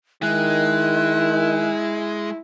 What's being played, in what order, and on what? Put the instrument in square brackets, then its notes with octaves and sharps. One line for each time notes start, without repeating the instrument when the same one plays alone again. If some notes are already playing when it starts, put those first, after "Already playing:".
[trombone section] D#3 [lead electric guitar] G#3 [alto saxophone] E4 [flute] F#6